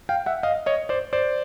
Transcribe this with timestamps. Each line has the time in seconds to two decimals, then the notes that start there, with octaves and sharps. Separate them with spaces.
0.09 F5 G5
0.26 E5 F#5
0.43 D#5 F5
0.66 C#5 D#5
0.89 C5 D5
1.13 C5 D5